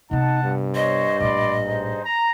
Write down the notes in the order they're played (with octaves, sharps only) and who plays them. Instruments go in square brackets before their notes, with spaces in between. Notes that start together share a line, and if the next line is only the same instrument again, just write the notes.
[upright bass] C3 B3 [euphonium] D#4 [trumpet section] F#5 A5
[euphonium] G2
[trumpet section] C5 C#5 [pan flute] D#5
[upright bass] A#1 A2 [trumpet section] D5 B5 C6
[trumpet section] D#4 G#4 C5
A#5